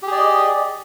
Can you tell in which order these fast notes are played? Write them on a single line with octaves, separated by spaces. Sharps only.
G4 G#4 D5 D#5